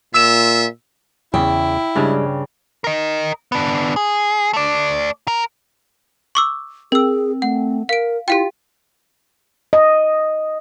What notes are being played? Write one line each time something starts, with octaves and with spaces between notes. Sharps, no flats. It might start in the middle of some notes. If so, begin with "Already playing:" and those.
A#2 F4 E5 E6 E7
E2 C#3 E4 G5
G2 C#3 G3 G#3 D4
A#4 D#5
B3 D4
G#4
A3 D5
A#4
C#6 D6 E6
C4 G#4 A#4 E6
A3 F#5
A#4 F5 D7
E4 F4 G4 F5 G5
D#5